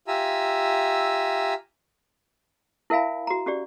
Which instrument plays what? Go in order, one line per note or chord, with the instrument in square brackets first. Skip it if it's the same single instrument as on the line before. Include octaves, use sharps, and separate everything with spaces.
[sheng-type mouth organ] F4 G4 E5 G#5 A#5 E6
[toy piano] E4 A#4 E5 F5 G#5 B5
F#4 A#5
C#4 F#4 G4 D5